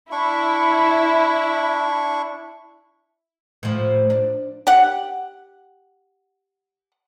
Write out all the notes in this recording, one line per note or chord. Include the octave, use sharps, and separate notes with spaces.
D4 E4 C#6
A2 F3
D4
G4 F#5